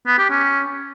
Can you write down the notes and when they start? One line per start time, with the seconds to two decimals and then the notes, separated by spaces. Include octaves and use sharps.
0.07 B3
0.18 G4
0.30 C#4